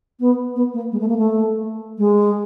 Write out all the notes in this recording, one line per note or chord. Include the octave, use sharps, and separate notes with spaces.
B3
B3
A#3
G#3
A3
A#3
A3
G#3